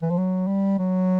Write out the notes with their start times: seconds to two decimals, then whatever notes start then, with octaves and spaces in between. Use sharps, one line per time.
0.02 E3
0.10 F3
0.18 F#3
0.47 G3
0.79 F#3